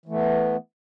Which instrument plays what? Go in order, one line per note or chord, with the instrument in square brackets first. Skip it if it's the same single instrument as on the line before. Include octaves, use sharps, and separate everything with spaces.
[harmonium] E3
A3
B3